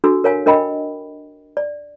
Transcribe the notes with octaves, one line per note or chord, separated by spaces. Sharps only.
D4 F#4 A4 E6
A#4 C#5 F5 G#5
D4 A#4 D#5 G5 B5
D5